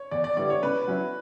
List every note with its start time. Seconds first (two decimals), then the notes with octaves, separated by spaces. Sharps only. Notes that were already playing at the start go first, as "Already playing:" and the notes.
Already playing: C#5
0.11 E2 D5
0.24 D5
0.37 D3 G3 B3 E4 D5
0.50 C#5
0.62 C#3 B4
0.87 F#3 C#4 E4